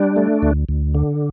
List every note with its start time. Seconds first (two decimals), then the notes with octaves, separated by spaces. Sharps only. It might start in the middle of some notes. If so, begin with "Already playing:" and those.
Already playing: G3 D4
0.16 A3
0.42 D2
0.69 D2
0.95 D3